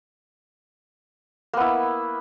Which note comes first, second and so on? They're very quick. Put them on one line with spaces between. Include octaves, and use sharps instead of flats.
A#3 B3 E4